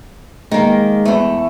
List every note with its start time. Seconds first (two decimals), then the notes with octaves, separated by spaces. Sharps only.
0.51 D#3 G#3 A#3
1.05 E2 A3